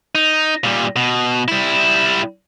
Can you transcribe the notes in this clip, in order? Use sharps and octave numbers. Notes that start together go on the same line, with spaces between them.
D#4
A#2 G3
B2
G3 E4